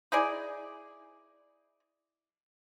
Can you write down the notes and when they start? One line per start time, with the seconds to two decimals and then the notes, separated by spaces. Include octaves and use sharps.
0.12 D#4 E4 G#4 D5